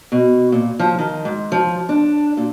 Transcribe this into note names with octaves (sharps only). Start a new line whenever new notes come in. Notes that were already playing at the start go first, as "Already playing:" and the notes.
B2
A#2
F3
D#3
G#2
F3
D4
A#2